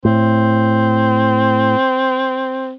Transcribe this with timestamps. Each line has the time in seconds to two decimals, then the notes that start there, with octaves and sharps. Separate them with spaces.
0.05 A2 C4